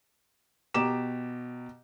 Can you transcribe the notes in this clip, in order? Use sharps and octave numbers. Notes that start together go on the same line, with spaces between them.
B2 G4 A#5 D6 E7